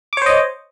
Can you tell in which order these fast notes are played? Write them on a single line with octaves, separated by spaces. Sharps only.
D6 C#5 C5 D#5